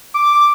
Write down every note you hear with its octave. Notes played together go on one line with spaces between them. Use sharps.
D6